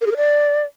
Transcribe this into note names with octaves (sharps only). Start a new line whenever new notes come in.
A#4
G#4
A#4
D5